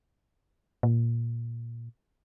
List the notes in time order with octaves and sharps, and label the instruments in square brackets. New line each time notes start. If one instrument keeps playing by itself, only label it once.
[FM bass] A#2